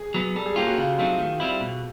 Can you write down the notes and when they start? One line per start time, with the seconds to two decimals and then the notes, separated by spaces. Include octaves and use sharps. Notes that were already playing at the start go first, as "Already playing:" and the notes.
Already playing: G#4
0.14 F#3 B3
0.36 G3 A4
0.46 G#4
0.56 A#3 C#4 F4 G4
0.67 F#4
0.78 C#3 F4
0.98 F#3 A3 C4 D#4 F4
1.18 D#3
1.40 G3 C4 E4
1.61 B2